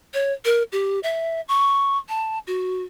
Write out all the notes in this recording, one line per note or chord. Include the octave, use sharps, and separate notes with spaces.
C#5
A#4
G4
E5
C#6
A5
F#4